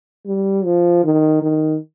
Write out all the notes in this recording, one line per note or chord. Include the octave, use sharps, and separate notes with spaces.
G3
F3
D#3
D#3